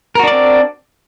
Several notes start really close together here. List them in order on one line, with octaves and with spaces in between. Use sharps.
A#4 F#4 D4 D5 C4